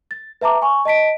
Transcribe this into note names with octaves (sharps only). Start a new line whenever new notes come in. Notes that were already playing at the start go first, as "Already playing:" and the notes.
A6
B4 E5 A5 A#5 D6
G#5 C#6
D#5 A5 B6 D7